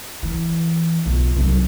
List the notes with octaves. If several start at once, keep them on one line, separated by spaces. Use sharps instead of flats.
E3
B1 F2
C2 F#3